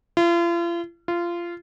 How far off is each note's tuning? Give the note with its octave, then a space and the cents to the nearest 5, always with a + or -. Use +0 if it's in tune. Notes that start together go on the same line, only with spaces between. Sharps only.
F4 -40
F4 -20